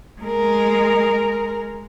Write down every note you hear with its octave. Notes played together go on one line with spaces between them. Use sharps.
G#3 A#4